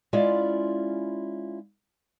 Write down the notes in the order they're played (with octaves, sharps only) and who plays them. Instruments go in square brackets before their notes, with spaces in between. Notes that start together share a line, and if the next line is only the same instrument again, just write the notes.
[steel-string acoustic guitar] G#3 C#4 E4 F4 D5 F5